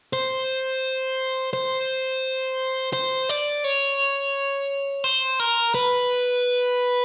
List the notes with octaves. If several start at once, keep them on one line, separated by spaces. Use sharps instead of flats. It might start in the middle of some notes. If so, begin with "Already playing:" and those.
C5
C5
C5
D5
C#5
C5
A#4
B4